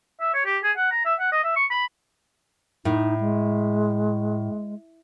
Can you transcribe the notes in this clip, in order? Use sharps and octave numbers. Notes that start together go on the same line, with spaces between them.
E5
C#5
G4
G#4
F#5
A#5
E5
F#5
D#5
E5
C#6
B5
A2 D#4
G#3